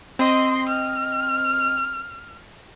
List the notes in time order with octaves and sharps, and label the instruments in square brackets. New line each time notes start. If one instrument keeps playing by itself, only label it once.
[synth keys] C4 D#5 [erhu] C6
[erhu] F6